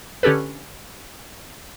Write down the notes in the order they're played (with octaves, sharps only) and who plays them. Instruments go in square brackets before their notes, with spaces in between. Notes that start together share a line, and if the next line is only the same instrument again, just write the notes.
[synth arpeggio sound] D3 C#4 G4 A4 B4